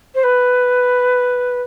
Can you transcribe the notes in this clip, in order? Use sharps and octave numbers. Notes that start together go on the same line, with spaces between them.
C5
B4